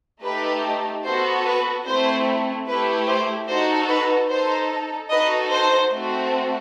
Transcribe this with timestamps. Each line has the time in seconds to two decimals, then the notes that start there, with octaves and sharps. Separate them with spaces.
0.23 A3 D#4 G4 B4
1.04 B3 F#4 A4 C5
1.45 B4
1.85 A3 C4 E4 C5
2.66 A3 E4 G4 B4
3.07 C5
3.48 D#4 F#4 A4 C5
3.88 B4
4.28 D#4 A4 C5
5.10 D#4 F#4 A4 B4 D#5
5.50 C5
5.91 A3 C4 F#4